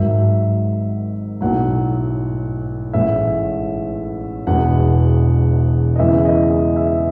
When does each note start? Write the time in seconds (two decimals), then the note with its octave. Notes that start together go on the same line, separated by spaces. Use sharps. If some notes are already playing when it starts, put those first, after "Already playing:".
Already playing: G#1 G#2 D#3 F#3 E5
1.41 B1 A2 F#3 F#5
2.93 A1 A2 G#3 E5
4.47 E1 E2 B2 G#3 F#5
5.96 D#5
5.99 E2 C#3 E3 G#3 E5
6.25 D#5
6.51 D#5
6.76 E5